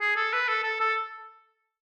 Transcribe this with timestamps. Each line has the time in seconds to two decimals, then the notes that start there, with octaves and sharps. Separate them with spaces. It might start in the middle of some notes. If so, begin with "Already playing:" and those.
0.01 G#4
0.16 A4
0.33 B4
0.48 A4
0.64 A4
0.80 A4